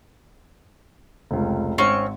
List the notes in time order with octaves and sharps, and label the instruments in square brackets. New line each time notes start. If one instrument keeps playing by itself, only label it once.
[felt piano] F1 C#2
[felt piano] G#1 [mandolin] C4 C#4 C#6